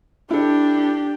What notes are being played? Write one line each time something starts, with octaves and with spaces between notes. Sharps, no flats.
D4 E4 G4 A4